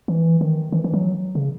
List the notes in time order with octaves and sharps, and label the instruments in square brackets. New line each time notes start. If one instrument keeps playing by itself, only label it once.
[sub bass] E3
D#3
E3
E3
F#3
C#3